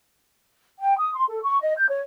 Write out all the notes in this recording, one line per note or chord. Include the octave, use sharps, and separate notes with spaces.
G5
D#6
C6
A4
C#6
D#5
G6
C#5